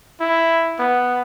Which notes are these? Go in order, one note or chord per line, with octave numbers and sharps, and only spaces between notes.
E4
B3